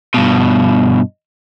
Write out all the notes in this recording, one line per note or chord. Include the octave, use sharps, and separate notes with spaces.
G2 B2